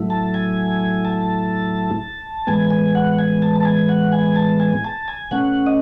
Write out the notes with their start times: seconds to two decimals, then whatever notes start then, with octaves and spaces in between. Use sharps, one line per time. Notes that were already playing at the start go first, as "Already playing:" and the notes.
Already playing: A2 F#3 A3 E4
0.10 A5
0.34 G#5
1.05 A5
2.47 A2 E3 G#3 B3 G#5
2.70 G#5
2.95 F#5
3.19 G#5
3.42 A5
3.60 A5
3.65 G#5
3.89 F#5
4.12 G#5
4.36 A5
4.60 G#5
4.84 A5
5.08 G#5
5.31 B2 A3 C#4 F#5
5.66 D#5